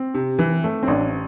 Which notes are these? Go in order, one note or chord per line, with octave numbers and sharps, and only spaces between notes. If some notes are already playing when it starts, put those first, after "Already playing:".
Already playing: C4
C3
E3
A3
C4
A1 D4